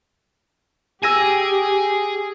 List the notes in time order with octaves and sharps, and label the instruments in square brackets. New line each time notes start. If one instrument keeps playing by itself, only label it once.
[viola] G4 [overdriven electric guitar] G#4 [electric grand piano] E6 A#6 D#7